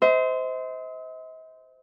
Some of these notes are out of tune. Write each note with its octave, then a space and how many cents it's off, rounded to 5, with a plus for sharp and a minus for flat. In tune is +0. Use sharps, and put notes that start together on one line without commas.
C5 -20 D#5 +45